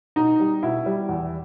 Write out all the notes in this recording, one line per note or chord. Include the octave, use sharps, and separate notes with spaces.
B2 D#4
G3
B2 E4
G3
E2